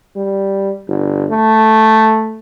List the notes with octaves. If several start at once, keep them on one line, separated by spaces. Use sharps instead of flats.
G3
G1
A3